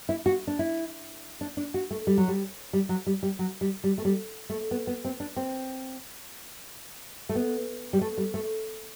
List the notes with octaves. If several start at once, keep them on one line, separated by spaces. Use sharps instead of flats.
E4
F#4
D4
E4
D4
D4
F#4
A3
G3
F#3
G3
G3
F#3
G3
G3
F#3
G3
G3
A3
G3
A3
B3
B3
C4
D4
C4
A3
B3
G3
A3
G3
A3